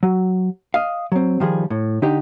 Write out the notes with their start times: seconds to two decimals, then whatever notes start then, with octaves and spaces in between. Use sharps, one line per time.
0.03 F#3
0.74 D#5 F5
1.12 F#3 C4
1.40 D#3 F3 G3 G#4
1.70 A2
2.02 D3 D4 D#4 G4